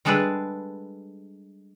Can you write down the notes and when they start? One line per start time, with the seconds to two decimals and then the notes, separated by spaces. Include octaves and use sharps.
0.05 G3 G#3 D4 G#4 A4 B4